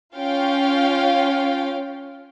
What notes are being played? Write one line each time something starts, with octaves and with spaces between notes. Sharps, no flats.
C#4 F4 F5 G5